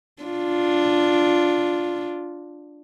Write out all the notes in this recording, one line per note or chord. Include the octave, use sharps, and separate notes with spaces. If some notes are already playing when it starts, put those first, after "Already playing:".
D4 F4